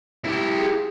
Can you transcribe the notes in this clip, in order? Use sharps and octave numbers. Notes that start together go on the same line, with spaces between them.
E4 G4
G#4